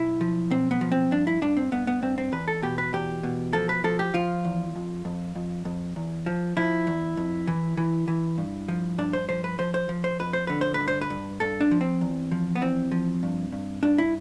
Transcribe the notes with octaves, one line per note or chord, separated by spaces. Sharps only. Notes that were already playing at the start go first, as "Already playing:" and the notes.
Already playing: B1 E4
F3
B1 C4
B3
F3
C4
G2 D4
E4
G2 D4
C4
G2 B3
B3
G2 C4
C4
E2 B4
A4
B2 G4
B4
E2 G4
B2
F3 A4
B4
F3 A4
G4
F3 F4
E2
F2
F2
F2
F2
E2
F3
F3 E4
E2
F2
E3
E3
E3
G2
F3
G2 D4
C5
F3 C5
B4
F3 C5
C5
F3
C5
F2 B4
C5
D3 B4
C5
B4
G2
C5
B4
G2
G2 A4
D4
F3
C4
E2
F3
B3
E2 C4
F3
G2
G2
G2 D4
E4